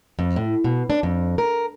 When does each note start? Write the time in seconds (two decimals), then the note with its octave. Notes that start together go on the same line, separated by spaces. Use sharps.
0.19 F2
0.36 A2
0.64 B2
0.90 D4
1.03 F2
1.38 A#4